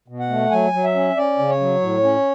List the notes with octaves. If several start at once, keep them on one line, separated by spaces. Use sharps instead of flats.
B2
F#5
A3
F#3 G#5
F#3
E5
C#4
C#4 D5
C#3
C#5
F#3
A2
C#4